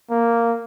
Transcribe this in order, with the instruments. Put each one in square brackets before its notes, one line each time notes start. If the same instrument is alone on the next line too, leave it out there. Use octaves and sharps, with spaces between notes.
[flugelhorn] A#3